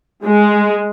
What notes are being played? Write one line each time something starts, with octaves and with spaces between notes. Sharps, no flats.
G#3